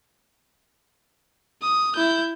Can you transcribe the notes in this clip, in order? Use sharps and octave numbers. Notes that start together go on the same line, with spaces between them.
D#6
E4 G6